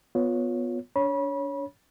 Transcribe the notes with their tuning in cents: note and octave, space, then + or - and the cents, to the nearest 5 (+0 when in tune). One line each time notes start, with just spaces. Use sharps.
B3 +0 F4 +25 C#5 +0
D4 -30 C#5 +0 B5 -30